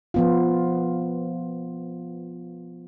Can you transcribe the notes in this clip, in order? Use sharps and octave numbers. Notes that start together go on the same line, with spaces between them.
F3 B3 F4